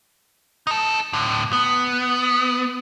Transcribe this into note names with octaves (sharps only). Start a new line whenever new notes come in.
D#4 A4
A2 D3
B3